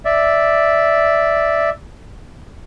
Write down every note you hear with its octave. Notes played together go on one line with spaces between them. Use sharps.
D5 E5